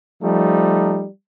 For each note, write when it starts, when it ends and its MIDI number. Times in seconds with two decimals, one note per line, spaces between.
0.23 1.06 53
0.23 1.06 55
0.23 1.06 57
0.23 1.06 63